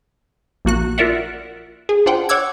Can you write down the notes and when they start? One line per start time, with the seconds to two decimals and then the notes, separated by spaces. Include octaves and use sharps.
0.65 A#1 A#3 F#4 F#6
0.98 F4 A#4 D5 E5 F#5
1.89 G#4
2.06 D4 F4 C5 F#5 G5
2.29 C#5 F#5 D6 E6 G#6